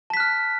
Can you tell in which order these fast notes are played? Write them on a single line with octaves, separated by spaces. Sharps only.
A5 B6 F#6 F6